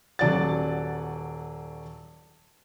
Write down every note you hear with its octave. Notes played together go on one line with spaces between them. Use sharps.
D#1 F#3 D5 F#5 A6